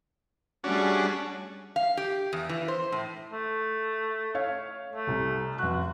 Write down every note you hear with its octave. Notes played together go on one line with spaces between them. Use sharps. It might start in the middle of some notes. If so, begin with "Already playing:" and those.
G3 A3 C#4 D4 F#4 G#4
F5
G4
E2
E3
C5
A2
A3
C#5 F5
A3
C2 C3
F1 F#4 F#6